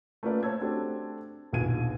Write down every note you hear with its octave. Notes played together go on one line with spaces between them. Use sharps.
A3 A#3 C#4 F4 B4 D5
C5 C#5 A5 E6 G#6
A3 C4 D4 F#4 G4 A4
A#1 D#2 B2 G#4 G#6 D#7